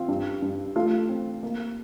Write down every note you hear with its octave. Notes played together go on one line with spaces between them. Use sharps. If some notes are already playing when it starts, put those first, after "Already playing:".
Already playing: C4 F4
G2
G2
A3 F4
C4
A#3